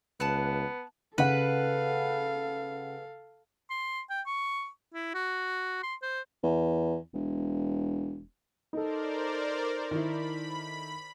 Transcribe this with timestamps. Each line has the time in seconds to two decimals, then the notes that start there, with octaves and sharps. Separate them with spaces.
0.20 C#2 B3 A5 F#6
1.18 C#3 A4 B4 F5 F#5
3.70 C6
4.10 G5
4.26 C#6
4.94 E4
5.14 F#4
5.83 C6
6.02 C5
6.43 E2
7.14 E1
8.73 D#4 A4 A#4 C5 D5
9.91 D#3 E4 B5